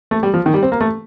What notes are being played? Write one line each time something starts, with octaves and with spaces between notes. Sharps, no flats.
A3
G3
F3
D#3
G3
C4
A#3
A3